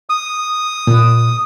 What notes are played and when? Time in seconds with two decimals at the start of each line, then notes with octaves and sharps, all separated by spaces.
0.10 D#6
0.87 A#2